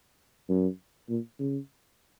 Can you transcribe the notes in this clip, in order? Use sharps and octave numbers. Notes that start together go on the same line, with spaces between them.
F#2
A#2
C#3